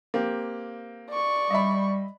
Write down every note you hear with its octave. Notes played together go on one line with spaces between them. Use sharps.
A#3 C4 G4
D5 C#6
G3 D#5 E5 B5